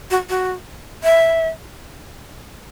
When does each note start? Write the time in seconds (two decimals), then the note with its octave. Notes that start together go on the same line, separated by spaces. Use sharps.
0.11 F#4
0.29 F#4
1.04 E5